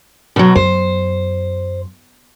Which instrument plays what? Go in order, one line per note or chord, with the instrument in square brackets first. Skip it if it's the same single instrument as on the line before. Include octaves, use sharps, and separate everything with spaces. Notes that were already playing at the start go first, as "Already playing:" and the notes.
[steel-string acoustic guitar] B2 F#3
[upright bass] F#2 [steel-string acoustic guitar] C5